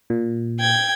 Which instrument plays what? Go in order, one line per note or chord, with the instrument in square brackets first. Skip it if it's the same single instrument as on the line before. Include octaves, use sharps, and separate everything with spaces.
[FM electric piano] A#2
[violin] G5 G#6